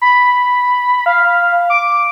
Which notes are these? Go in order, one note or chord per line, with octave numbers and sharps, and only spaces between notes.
B5
F5
D6